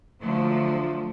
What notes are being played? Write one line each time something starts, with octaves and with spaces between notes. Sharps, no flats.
D3 F3 F#3 A3